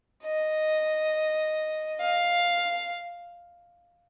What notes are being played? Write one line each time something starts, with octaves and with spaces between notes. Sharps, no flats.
D#5
F5